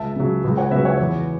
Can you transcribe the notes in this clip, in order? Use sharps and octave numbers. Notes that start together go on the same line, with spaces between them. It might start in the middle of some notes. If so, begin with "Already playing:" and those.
Already playing: C#2 E5 A5
C#3 F#3
C#2
C#5 F#5
C#3 F#3 B4 E5
C#5 F#5
E2